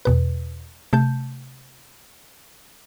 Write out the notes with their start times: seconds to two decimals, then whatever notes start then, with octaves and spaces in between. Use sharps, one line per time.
0.05 E2 B2 B4
0.93 C3 A3 A5 G6